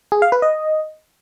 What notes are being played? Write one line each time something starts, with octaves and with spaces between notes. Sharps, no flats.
G#4
F5
B4
D#5